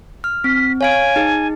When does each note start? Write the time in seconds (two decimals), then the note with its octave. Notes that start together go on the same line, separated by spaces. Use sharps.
0.24 F6
0.44 C4 B6
0.81 C#5 F5 G#5 D7
1.16 D#4 G#4